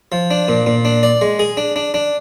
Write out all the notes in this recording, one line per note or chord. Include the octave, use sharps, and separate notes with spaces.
F3
D4
A#2
A#2
D4
D5
G#3
G#4
D4
D4
D4